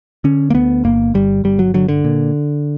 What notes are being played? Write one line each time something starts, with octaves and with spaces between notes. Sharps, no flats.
D3 C#4
A#3
D2 B3
G1 A#3
G1 G3
G1 G3
F#3
D3 F#3
D3
A#2